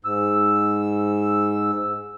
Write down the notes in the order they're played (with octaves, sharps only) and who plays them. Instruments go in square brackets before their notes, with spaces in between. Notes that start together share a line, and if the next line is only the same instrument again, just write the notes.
[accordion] G#2 E6